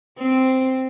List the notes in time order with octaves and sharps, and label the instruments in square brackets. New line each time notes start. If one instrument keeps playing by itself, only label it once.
[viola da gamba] C4